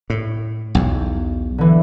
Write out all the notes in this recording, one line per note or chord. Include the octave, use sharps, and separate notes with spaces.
A2
B1 E2
D3 E3